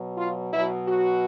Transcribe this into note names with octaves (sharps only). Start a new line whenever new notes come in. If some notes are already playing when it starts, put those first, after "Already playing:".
Already playing: B2 F#3
F4
B2 F#3 E4
F#4